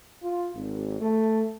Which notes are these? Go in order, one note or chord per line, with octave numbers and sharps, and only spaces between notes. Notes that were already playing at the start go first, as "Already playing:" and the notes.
F4
G#1
A3